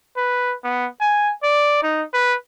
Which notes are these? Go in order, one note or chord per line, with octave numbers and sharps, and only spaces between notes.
B4
B3
G#5
D5
D#4
B4